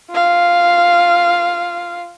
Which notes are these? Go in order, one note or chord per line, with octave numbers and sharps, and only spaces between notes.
F4 F5